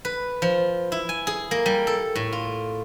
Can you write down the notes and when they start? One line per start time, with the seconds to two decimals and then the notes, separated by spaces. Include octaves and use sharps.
0.05 B4
0.42 F3
0.92 E4
1.09 G#5
1.27 G#4
1.51 A#3
1.66 G3
1.87 A4
2.16 A2
2.33 F4